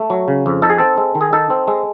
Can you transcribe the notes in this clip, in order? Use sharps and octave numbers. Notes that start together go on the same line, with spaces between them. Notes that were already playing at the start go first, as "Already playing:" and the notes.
Already playing: A3
F#3
C#3
F2
D#4 A4
G#4
C4 A4
G#3
D#3
G#4
D#4 A4
C4
G#3